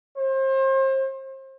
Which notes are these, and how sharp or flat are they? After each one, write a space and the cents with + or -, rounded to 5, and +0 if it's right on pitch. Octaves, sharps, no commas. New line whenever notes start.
C5 +35